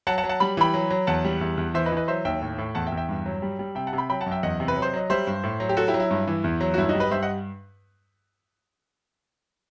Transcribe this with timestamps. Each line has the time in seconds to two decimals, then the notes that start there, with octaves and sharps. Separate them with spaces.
0.07 F#3 F#5 A5
0.18 F#5 A5
0.24 F#3
0.29 F#5 A5
0.40 G3 B5
0.57 E3 G5 B5
0.74 F#3
0.91 F#3
1.07 E2 F#5 A5
1.25 G3
1.41 E2
1.58 E2
1.74 E3 C5 E5
1.86 B4 D#5
1.92 E3
1.97 B4 D#5
2.08 F#3 C5 E5
2.25 D#2 E5 G5
2.42 A2
2.58 A2
2.75 E2 F#5 A5
2.87 E5 G5
2.92 E2
2.97 E5 G5
3.09 G2
3.26 F#3
3.42 G3
3.59 G3
3.75 C3 E5 G5
3.87 F#5 A5
3.93 C3
3.98 G5 B5
4.09 F#3 G5 B5
4.21 F#5 A5
4.26 F#2
4.31 E5 G5
4.43 E2 D#5 F#5
4.60 C3
4.68 B4
4.76 F#3
4.82 C5
4.93 F#3 D#5
5.10 G3 C5 E5
5.27 G2
5.44 A2
5.60 F#3
5.69 G4
5.77 F#3 F#4 A4
5.88 E4 G4
5.94 F#3
6.00 E4
6.11 G2
6.27 E3
6.44 E2
6.61 F#3
6.74 F#4
6.78 G2 E4
6.89 D#4 F#4
6.95 G3
7.00 B4 D#5
7.11 G2 C5 E5
7.22 D#5 F#5